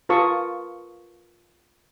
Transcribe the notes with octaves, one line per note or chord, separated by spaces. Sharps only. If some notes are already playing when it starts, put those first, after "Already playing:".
F4 A#4 B4 A5 C#6 D#6